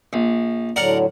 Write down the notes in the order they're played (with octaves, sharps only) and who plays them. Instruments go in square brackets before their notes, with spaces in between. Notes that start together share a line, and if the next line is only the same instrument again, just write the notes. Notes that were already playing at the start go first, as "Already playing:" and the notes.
[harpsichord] A#1
[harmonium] A2 D3 F#3 [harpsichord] A#4 D5 F#5